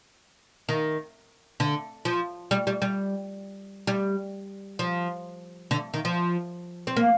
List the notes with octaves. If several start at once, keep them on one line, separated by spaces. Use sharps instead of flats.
D#3
D3
F3
G3
G3
G3
G3
F3
D3
D#3
F3
C4
A#3